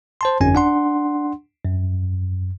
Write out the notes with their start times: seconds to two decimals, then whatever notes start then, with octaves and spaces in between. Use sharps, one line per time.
0.21 C5 A5 C6
0.40 G1 F2 C#4 G#5
0.55 D4 F#5 C6
1.65 F#2